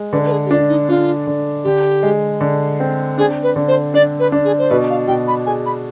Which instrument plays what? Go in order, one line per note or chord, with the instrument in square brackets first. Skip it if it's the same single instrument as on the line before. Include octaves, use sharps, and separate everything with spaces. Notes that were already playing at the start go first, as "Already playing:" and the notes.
Already playing: [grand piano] G#3
[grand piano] D3 [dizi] B4
[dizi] B4
G#4
G4
[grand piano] D4 [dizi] F4
[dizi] D#4
[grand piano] D4 [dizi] F4
[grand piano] D3
[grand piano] D3 [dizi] G4
[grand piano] G#3
D3
C4
[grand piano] D4 [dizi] G#4
[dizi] B4
[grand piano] D3
[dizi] C5
[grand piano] D4 [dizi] D5
[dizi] B4
[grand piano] D4
[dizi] G#4
C5
[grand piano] B2 [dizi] B4
[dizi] F5
[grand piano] B2 [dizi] G5
[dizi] B5
[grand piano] G#4 [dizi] G#5
[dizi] B5